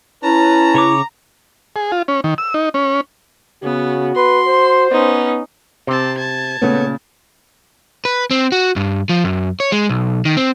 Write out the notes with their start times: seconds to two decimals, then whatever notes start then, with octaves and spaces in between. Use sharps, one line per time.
0.23 C#4 E4 B4 A5 A#5
0.75 C#3 C#5 D6
1.76 G#4
1.92 F4
2.08 C#4
2.24 D#3
2.38 E6
2.54 D#4
2.74 C#4
3.63 C#3 B3 F#4
4.16 B4 C6
4.47 C5
4.91 B3 C#4 D#4
5.87 C3 C4 A5
6.19 A5 G#6
6.62 A#2 C#3 A3 B3 C#4
8.05 B4
8.31 C4
8.52 F#4
8.76 G2
9.09 F3
9.24 F#2
9.60 C#5
9.72 G#3
9.90 B1
10.25 D#3
10.37 C4